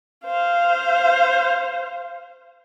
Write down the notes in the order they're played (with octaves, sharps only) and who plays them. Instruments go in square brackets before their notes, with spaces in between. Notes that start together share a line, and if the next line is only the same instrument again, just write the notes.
[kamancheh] C5 F5